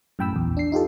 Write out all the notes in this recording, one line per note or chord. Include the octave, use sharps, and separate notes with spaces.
F#2 A2 G5 B5 E6
A#1 E2
D4 C7
D#4 F4 G4 A4